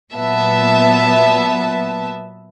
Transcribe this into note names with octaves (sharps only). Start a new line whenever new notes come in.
A#2 F#3 B3 E5 A5